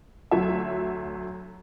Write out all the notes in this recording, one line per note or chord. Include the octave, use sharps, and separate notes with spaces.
D2 F#3 E5